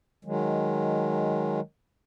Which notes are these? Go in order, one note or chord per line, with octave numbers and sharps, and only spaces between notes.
D#3 F#3 G#3